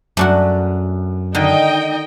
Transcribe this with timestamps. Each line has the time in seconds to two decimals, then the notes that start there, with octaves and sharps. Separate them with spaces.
0.17 F#2 A3 D4 F#4
1.35 D3 D#3 D#4 D#5 G5